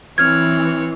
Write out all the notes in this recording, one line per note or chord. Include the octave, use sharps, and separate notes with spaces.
E3 C4 C#5 F6 G#6